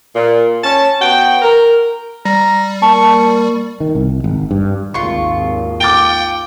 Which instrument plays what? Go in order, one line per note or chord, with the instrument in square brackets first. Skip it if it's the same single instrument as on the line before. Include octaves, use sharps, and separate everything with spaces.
[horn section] A#2
C#4 A5
B3 F#4 G5
A#4
[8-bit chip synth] G3 [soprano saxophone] A#5
[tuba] A#3 [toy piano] A5 [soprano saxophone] C#6
[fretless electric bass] D#3
C2
G#1
G2
[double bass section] G#1 D#2 [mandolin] F4 C#6
[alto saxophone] G5 [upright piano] D6 A6 G7